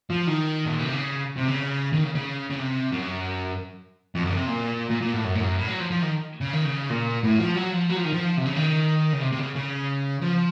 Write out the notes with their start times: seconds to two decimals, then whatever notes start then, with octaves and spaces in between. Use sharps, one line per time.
0.10 F3
0.27 D#3
0.65 A#2
0.79 C3
0.93 C#3
1.37 C3
1.48 C#3
1.93 D#3
2.04 C#3
2.15 C#3
2.50 C#3
2.59 C3
2.92 F#2
4.15 F2
4.25 F#2 C#3
4.36 C3
4.47 A#2
4.91 A#2
5.02 A#2
5.13 A2
5.24 F#2
5.35 A2
5.40 F#2
5.57 A2
5.68 F#3
5.80 F3
5.90 F3
6.02 D#3
6.41 C#3
6.53 D#3
6.65 C#3
6.89 A#2
7.24 A2
7.39 F3
7.56 F#3
7.72 F3
7.89 F#3
7.96 F3
8.05 D#3
8.13 F3
8.37 C3
8.46 C#3
8.56 D#3
9.13 C#3
9.21 C3
9.32 C3
9.39 C#3
9.56 C#3
10.22 F3